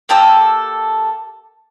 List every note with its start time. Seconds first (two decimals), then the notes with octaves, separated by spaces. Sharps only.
0.09 A#3 G4 A4 E6